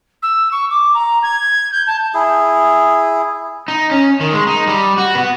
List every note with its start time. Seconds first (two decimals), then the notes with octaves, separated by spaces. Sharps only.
0.22 E6
0.51 C#6
0.70 D6
0.94 A#5
1.23 G#6
1.72 G6
1.87 A5
2.14 E4 G#4
3.68 D#4
3.91 C#4
4.20 D#3
4.33 G#3
4.47 D#4
4.68 G3
4.98 F#4
5.15 B3